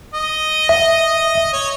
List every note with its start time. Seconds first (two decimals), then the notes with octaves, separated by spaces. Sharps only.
0.14 D#5
0.69 E5
1.53 C#5